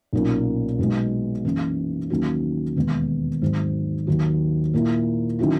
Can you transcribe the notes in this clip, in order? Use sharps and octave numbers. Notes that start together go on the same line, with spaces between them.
B1 A#2 A#3 C#4
B1 B2 G#3
F#2 E3 A#3 C#4
D#2 D#3 F#3 A#3 C#4
E1 D#2 D#3 G#3 B3
G#1 G#2 F#3
D#2 D#3 F#3
A#2 A#3 E4
D#3 F#3 C#4 E4